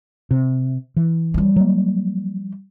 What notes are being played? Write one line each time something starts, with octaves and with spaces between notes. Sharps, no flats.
C3
E3
F3 G3
F#3 A#3